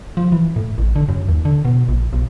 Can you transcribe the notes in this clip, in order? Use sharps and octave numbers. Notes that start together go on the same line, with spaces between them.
F3
E3
A2
A1
D3
F#2
D#2
D3
B2
A#1
B1